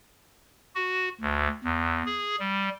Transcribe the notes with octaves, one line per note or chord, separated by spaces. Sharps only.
F#4
D2
E2
G#4
G3